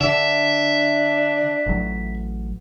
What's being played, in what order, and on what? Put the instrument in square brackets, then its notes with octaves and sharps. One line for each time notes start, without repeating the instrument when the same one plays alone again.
[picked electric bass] D3 [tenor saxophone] D4 [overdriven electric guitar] E5
[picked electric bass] A1 F#3